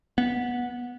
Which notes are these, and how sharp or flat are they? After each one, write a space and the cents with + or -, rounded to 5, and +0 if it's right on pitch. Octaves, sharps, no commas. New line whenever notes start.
B3 -15